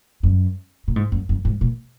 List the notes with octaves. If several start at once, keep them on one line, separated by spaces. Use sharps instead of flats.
F#2
A#2
G#2
F#2
F#2
G#2
A#2